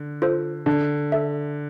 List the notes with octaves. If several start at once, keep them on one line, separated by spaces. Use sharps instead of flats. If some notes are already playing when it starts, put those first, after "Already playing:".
Already playing: D3
F4 A4 C5
D3 D4
A4 E5